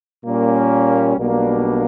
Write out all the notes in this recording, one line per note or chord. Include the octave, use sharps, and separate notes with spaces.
A#2 G3 A#3 C#4
B1 B2 G3 A#3 D4